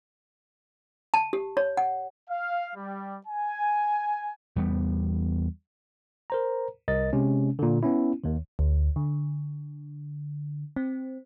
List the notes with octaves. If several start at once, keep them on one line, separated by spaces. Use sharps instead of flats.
A5
G4
C#5
F#5
F5
G3
G#5
E2 G3 B3
A#4 C5 A#5
C2 A#4 D#5 A6
C3 G#3 C#4
A#2 D3
B3 C#4 E4
D#2 D#3
D2
D3
C4